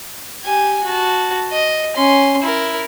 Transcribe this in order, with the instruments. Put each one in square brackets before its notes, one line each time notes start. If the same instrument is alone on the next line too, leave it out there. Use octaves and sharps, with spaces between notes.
[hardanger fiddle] G4 G#5
F#4 A5
D#5
C#4 C6
E4 A#4